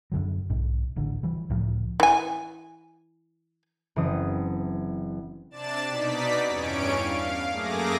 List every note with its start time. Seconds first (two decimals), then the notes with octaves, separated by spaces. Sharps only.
0.12 F#2 D3 F#3
0.50 B1 G#2
0.96 D1 A1 D3
1.23 E3 G3
1.50 C#2 A2 F3
2.00 E3 G#5
3.96 F#1 E3 C4 D#6
5.50 C3 D4 D5 A5 A6 E7
5.89 B2 D#4 D5 B6
6.47 E2 G2 C#4 C#5 D7
6.92 F5
7.50 F#2 A3 A#3 G#4 D6 A#6